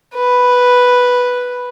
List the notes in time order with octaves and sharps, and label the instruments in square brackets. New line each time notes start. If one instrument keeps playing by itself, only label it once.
[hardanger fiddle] B4